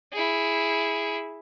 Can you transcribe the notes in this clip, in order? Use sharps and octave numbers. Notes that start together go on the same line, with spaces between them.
E4 G#4